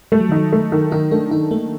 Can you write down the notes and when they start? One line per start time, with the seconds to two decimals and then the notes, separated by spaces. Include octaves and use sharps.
0.12 G3 A3
0.21 F#3
0.29 D#3 D#4
0.37 F#3
0.52 A3
0.72 D#3
0.92 D#3 D#4
1.11 A3 D4
1.31 D#3 D#4
1.51 A3 A#3